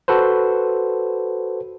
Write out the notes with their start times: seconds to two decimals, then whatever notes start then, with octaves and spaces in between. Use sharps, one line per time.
0.08 F#4 A4 B4 C5